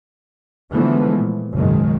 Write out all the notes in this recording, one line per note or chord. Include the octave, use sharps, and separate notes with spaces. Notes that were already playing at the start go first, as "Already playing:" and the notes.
D3 E3 F3 G#3 A3 B3
A#2
F#1 B1 G#2 D#3 G#3